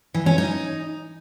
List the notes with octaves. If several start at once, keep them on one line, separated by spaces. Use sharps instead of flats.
E3
C#4
D#4